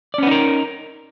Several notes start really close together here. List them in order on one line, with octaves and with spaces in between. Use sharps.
D5 C#4 B3 D#4 A#4